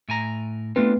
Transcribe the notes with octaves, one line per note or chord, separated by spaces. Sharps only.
A2 G#5 A#5
A3 B3 C4 D4 F4 B4